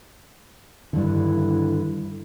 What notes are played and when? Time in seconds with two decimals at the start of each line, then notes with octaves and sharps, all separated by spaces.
0.93 G2 D3 D#3 G3 E4